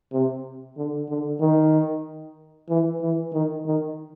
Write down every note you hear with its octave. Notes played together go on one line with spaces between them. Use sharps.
C3
D3
D3
D#3
E3
E3
D#3
D#3